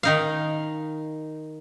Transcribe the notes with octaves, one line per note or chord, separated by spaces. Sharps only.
D#3 D#4 F5